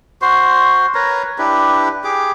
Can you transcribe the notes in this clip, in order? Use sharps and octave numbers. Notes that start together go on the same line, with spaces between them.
F#4 C5 C6
A#4 B4 C#5 A#5
D4 E4 G4 B4
G4 G#4 D6